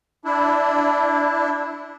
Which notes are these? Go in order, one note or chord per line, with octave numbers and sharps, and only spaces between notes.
D4 E4